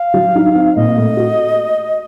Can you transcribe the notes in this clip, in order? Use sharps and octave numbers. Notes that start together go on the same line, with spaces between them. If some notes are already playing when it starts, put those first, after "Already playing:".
Already playing: F5
F#3
D#4
C4
A#2 D#5
A3
F#4